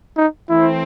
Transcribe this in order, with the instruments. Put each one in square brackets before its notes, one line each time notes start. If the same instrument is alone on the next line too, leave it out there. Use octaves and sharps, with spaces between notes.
[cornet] D#4
[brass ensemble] E3 A3 C4 [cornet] E4